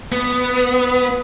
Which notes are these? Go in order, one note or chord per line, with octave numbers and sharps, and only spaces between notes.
B3